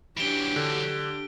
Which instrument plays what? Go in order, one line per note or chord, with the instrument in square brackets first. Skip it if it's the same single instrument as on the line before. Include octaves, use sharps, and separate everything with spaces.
[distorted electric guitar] E3 F#3 [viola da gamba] D4 G4 [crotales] D7 G7
[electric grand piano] D3